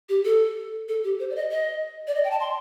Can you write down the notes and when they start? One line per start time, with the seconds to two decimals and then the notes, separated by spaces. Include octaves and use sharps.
0.09 G4
0.25 A4
0.88 A4
1.04 G4
1.20 C5
1.30 D5
1.36 D#5
1.51 D#5
2.08 D5
2.15 D#5
2.24 G5
2.31 A5
2.40 C6